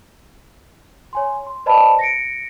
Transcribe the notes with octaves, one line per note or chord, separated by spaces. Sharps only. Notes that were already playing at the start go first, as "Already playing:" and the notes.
C#5 G#5 C6
C6
B4 C5 D5 D#5 A5 B5
A#6 C#7 D7